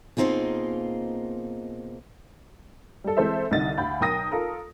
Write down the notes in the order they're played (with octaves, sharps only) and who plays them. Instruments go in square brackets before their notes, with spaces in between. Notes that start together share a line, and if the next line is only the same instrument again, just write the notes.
[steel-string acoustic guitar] B2 A#3 C4 D#4 F4 G#4
[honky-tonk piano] G3 A4
E3 G#3 C4 A4 C5 E5
C2 D3 D#3 D#5 A6
D2 F5 B5 G6
B1 A#4 G5 D#6 A#6
F4 A4 A#4